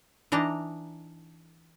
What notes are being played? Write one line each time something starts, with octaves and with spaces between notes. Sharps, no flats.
E3 D4 D#4 A5 A#5